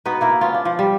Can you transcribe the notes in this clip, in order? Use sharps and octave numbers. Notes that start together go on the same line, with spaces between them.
B3 D#4 F#4 B4
A#3 E4 A#4
B3 C#4 F4
D4
F3
G3